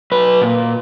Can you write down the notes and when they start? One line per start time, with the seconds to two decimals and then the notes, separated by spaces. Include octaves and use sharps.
0.12 F#3 B4
0.41 A#2